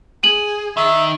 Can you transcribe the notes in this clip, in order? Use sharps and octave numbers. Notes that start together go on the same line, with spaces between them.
G#4 D#7 F#7
D#3 E5